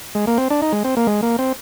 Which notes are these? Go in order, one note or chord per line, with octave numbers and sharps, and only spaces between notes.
G#3
A#3
C4
D4
D#4
G#3
C4
A#3
G#3
A#3
C4